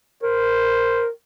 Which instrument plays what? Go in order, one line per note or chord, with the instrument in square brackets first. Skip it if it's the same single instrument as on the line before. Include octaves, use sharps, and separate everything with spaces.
[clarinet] A#4 [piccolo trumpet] C5